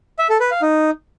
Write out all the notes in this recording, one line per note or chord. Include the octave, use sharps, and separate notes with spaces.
E5
A4
B4
F5
D#4